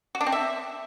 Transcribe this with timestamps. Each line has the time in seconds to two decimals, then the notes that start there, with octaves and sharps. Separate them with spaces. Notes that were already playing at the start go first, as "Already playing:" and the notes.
0.15 F#4
0.21 D4
0.26 C4
0.32 E5